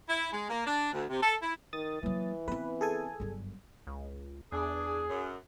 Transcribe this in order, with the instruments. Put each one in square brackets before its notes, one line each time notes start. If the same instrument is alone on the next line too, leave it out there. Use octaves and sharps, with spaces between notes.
[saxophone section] E4
G#3
A#3
D4
D2
C3
A4
E4
[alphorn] D#3 [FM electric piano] D#6 A6
[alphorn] E3 [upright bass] F#3 A#3
[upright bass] B3 C4 [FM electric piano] B4
[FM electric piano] G#4 A4 G#5
[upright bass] G1 F#2
[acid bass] C#2
[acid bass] E2 [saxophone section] D4 [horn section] G#4
[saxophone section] F#2